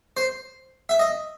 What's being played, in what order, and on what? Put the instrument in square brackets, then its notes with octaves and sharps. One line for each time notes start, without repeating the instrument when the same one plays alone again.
[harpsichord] C5
E5
D#5